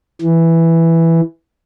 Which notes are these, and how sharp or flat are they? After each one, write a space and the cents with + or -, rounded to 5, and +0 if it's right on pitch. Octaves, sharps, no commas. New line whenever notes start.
E3 +0